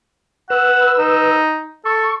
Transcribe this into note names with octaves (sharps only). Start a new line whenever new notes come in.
B4 F#5 E6
D#4
A4 C#6